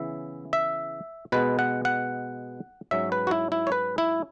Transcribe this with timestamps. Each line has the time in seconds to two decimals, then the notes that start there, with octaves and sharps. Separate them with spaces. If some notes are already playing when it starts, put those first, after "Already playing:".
Already playing: C#3 E3 B3 E5
0.53 E5
1.32 B2 G#3 B3 B4
1.59 F#5
1.85 F#5
2.91 G#2 F#3 C#4 E5
3.12 B4
3.27 F#4
3.31 E4
3.52 E4
3.67 C#5
3.72 B4
3.98 E4